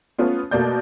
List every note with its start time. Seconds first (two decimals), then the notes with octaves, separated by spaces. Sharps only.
0.19 A3 B3 C#4 F4
0.51 B2 A3 A#3 D5 G6